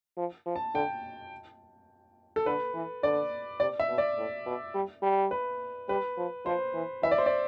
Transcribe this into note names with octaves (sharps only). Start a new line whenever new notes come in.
F3
F3
A5
D3 G5
A4
D3 B4
E3
D3 D5
C3 D5
E5
B2
D5
A2
B2
G3
G3
B4
G3 B4
F3
F3 C5
E3
E3 E5
D5
C5
D5